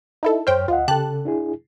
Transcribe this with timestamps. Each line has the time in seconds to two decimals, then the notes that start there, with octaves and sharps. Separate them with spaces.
0.23 D#4 E4 A4
0.47 F#2 C5 C#5 G5 F6
0.68 D2 F4 D#5 F#5
0.88 C#3 G4 A4 A5 F#6
1.25 D4 E4 G#4